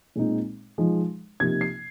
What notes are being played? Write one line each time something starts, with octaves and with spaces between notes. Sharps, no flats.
A#2 G#3 C4 D#4
F3 G#3 D#4
C3 F3 A#3 D#4 G#6
C7